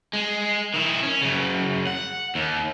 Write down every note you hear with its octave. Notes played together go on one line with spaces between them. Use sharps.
G#3
D#3 E4
C#4
F#2 C#3
F#5
D#2